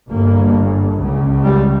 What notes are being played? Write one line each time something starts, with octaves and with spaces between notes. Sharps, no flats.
G1 G2 A#3
C#2 C#3
G3